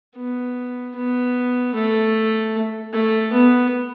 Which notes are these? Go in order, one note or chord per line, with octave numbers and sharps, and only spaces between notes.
B3
B3
A3
A3
B3